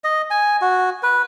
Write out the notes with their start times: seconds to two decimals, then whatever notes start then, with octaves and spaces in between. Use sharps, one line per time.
0.04 D#5
0.30 G#5
0.62 F#4
1.03 B4